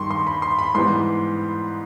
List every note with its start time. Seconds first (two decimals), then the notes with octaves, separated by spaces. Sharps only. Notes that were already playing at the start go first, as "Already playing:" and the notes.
Already playing: G2 D#3 G3 C6 C#6
0.11 C6
0.27 B5
0.42 C6
0.59 B5
0.75 G#2 E3 G3 B3 C6